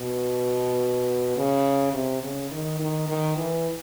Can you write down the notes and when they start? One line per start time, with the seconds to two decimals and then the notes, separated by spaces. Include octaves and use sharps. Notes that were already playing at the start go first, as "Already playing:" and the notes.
Already playing: B2
1.37 C#3
1.94 C3
2.23 C#3
2.51 D#3
2.80 D#3
3.08 D#3
3.37 E3